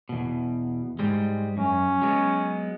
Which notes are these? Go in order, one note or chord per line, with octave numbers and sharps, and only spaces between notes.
E2 B2
G#2 G3 G#3
F#2 C#4
F#3 G#3 B3